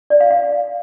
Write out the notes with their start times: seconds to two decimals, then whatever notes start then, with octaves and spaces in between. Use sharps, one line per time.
0.10 D5
0.20 F5
0.31 F5